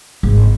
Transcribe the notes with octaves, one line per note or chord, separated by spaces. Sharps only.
G#1